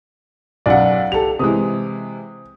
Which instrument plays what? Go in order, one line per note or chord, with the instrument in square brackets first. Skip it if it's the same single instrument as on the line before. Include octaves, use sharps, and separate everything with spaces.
[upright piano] B1 F#2 [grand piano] D5 F5 F#5
[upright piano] G4 A4 [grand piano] F7
[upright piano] C3 E3 G#3 [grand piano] D#6